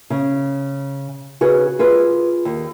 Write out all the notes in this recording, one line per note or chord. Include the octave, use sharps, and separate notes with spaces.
C#3
C#3 F#4 G#4 B4
F4 G#4 B4
D#2